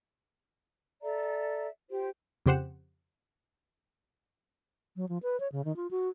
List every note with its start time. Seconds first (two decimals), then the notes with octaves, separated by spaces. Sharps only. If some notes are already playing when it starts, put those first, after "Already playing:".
1.02 A4 D5 E5 A#5
1.90 F4 G4 C5
2.46 F2 C#3 G4 C5 F#5 E7
4.96 F#3
5.09 F3
5.23 B4
5.40 C#5
5.52 C#3
5.65 D#3
5.76 F4
5.91 F#4